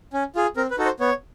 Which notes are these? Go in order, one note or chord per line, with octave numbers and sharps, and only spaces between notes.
C#4
F4 G#4
C4 A#4
B4
D#4 F#4 A4
C5
B3 C#5